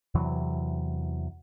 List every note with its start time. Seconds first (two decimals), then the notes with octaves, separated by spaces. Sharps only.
0.15 E2 C3 E3 F#3